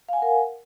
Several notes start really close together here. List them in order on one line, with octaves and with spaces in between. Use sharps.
F5 G#5 F#5 A#4